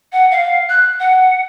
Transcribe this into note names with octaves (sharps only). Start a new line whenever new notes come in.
F#5
F5
F#6
F#5